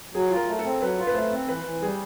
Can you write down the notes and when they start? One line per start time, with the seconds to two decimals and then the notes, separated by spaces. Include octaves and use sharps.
0.14 F#3 G#4
0.31 F4
0.36 A#4
0.48 A3
0.59 A4
0.64 C4
0.81 F#3 B4
0.98 F4
1.07 B4
1.14 A3 C5
1.32 C4
1.48 E3 B4
1.65 E3
1.82 G3 G#4